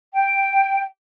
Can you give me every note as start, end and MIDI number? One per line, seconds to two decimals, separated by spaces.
0.13 0.83 79